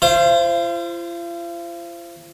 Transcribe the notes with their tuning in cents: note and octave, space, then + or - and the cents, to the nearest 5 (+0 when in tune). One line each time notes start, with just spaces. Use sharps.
F4 -40 C5 +0